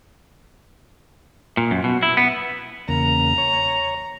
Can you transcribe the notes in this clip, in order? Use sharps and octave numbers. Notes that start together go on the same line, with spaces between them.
A#2
F#2
B2
E4
B3
E2 C#3 A#3 A#5
C#5